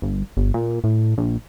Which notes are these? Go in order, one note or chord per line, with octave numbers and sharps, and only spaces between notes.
G1
G1
A#2
A2
A#1